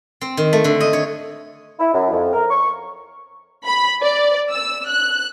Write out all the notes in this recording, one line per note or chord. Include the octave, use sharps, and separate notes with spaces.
C4
D#3
A3
D3
D#5
C#5
E4
F#2
F2
A#4
C#6
B5
D5
E6
F#6